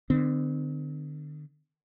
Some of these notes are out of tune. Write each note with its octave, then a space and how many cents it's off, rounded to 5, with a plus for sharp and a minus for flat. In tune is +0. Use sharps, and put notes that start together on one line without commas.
D3 +40 C4 -40